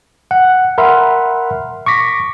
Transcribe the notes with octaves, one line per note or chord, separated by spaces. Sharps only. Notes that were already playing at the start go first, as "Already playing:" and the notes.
F#5
A#4 E5 F#5 B5 C6 F6
C#6 D6 A#6 B6